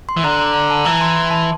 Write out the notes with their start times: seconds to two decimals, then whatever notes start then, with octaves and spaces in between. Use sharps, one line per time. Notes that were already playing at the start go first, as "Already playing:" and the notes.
0.09 C6
0.17 E3
0.23 D3 A#5
0.39 A#5
0.54 A#5
0.70 A5
0.85 E3 A#5
1.01 C6
1.16 C6
1.31 A5